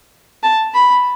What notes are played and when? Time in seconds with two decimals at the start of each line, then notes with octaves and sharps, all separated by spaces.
0.43 A5
0.74 B5